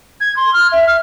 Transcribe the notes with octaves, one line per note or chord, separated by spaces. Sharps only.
G#6
C6
F6
E5
F6